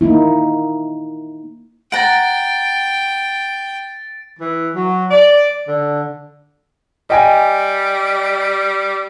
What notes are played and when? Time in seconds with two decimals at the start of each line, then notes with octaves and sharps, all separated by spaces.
0.01 A#3 D#4 E4
1.92 F#5 G5 A#5 A6 D7
4.39 E3
4.75 F#3
5.11 D5
5.68 D3
7.10 G3 D#5 G5 G#5